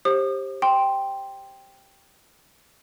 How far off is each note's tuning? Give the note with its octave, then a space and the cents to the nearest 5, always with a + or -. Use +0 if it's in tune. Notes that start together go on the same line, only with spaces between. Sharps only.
G4 +0 C5 +30 D#6 -35
G5 +0 C6 +0